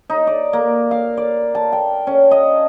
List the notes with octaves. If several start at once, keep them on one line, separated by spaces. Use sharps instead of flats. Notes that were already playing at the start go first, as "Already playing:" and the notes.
D#4
D5
A#3
F5
D5
A5
G5
C#4
D#5